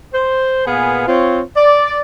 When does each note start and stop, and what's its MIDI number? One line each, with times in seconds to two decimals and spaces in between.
0.13 0.65 72
0.66 1.04 46
0.66 1.04 59
0.66 1.04 68
0.66 1.04 71
0.66 1.04 77
0.66 1.04 80
1.07 1.41 60
1.07 1.41 65
1.07 1.41 73
1.56 2.00 74